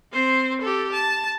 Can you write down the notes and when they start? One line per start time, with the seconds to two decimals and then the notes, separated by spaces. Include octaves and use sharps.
0.12 C4 C5
0.61 G4 A4
0.92 A5